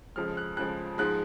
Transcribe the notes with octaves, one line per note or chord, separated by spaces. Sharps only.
F2 C#3 F3 G#3 F6
F#6
F2 C#3 F3 G#3 F#6
G#2 F3 G#3 F#6